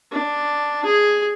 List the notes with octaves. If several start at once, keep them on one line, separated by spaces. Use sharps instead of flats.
D4
G#4